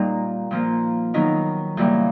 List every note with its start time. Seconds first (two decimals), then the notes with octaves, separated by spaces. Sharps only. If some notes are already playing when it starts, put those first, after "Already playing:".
Already playing: A#2 G3 A#3 D#4
0.51 A#2 F3 A#3
1.14 D#3 F#3 B3 D#4
1.77 F#2 C#3 E3 G3 A#3